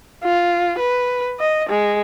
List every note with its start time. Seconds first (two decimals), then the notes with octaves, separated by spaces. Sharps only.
0.23 F4
0.79 B4
1.40 D#5
1.69 G#3